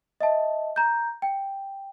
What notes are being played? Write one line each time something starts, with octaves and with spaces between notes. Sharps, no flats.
D#5 E5 A5
A#5 G6
G5